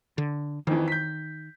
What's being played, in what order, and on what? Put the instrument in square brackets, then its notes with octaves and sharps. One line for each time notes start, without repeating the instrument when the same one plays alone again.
[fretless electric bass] D3
[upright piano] F2 E3 [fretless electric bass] D#3
[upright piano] G6 B6